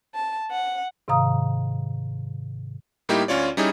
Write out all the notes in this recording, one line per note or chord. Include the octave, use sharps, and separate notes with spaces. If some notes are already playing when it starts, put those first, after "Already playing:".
A5
F#5
G#2 C3 D#3 F5 A#5 D#6
A2 G3 A#3 D#4 E4 G4
D2 C#4 F4 C#5 D5
G3 C#4 D#4 E4 G#4